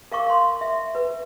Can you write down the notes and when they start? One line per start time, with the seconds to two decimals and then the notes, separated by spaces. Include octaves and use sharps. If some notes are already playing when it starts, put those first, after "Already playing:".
0.12 A#4 F5 C#6 D6
0.27 F5 C6
0.61 E5
0.95 B4